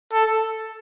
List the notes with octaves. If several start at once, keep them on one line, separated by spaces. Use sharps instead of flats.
A4